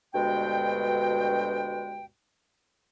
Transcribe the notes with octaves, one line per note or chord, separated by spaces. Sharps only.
D2 G2 B2 G#3 G5